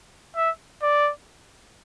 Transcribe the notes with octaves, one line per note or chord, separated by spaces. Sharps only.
E5
D5